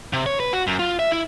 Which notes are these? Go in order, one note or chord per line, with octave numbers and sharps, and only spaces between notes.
C3
C#5
B4
F#4
F#2
F4
E5
E4